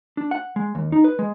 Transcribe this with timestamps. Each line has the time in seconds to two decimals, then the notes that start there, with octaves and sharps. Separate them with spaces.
0.17 D4
0.31 F#5
0.56 G#3
0.75 D#2
0.92 D#4
1.04 B4
1.19 G#3